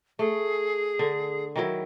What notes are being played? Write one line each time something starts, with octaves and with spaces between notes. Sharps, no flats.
A3 G#4
D3
D#3 F#3 E4